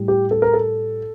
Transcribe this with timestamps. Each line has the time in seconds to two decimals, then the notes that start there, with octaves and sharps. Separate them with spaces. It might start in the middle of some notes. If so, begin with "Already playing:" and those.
Already playing: A2 G3
0.08 G4
0.31 A4
0.42 A#4
0.53 A4